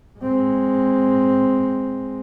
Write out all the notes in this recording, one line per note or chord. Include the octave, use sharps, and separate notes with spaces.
G#3 C4